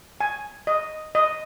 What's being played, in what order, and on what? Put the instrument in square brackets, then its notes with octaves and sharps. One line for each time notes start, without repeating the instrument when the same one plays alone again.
[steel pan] G#5
D#5
D#5